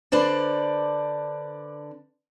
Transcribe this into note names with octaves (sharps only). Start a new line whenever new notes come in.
D3 D4 B4 C5 D5